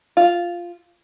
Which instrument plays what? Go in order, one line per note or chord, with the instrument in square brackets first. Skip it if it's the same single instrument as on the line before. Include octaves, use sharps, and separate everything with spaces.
[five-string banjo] F4